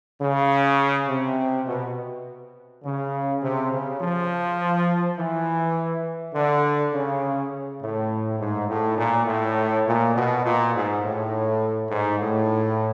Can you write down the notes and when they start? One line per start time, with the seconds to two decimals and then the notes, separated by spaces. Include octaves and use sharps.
0.20 C#3
1.08 C3
1.66 B2
2.84 C#3
3.42 C3
3.71 C#3
4.01 F3
5.17 E3
6.34 D3
6.93 C#3
7.81 A2
8.39 G#2
8.69 A2
8.97 A#2
9.27 A2
9.86 A#2
10.14 B2
10.44 A#2
10.73 G#2
11.03 A2
11.89 G#2
12.19 A2